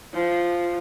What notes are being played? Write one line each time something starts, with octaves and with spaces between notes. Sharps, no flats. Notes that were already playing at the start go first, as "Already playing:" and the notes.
F3